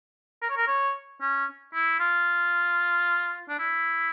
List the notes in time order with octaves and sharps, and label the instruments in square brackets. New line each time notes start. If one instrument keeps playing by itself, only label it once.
[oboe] A#4
C#5
A#4
C#5
C#4
E4
F4
D4
E4